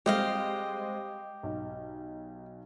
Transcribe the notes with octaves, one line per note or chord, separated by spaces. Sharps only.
G3 G#3 C4 G4 D#5 F5
B1